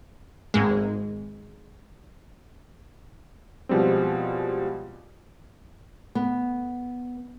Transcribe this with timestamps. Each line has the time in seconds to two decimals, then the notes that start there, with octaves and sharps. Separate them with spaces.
0.54 G#1 G#2 G#3
3.69 B2 F3 G3 G#3 C4
6.15 B3